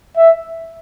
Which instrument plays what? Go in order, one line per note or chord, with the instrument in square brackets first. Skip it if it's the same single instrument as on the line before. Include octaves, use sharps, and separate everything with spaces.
[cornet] E5